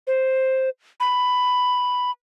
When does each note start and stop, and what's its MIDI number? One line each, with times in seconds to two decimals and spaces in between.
0.07 0.69 72
1.00 2.11 83